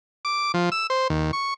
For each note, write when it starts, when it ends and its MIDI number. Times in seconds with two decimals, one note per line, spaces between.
0.25 0.52 86
0.54 0.70 53
0.72 0.87 88
0.90 1.08 72
1.10 1.31 39
1.33 1.54 85